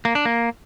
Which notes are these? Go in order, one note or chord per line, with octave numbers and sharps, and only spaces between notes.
A#3
D4
A#3